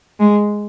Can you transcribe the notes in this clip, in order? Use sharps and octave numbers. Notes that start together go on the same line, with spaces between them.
G#3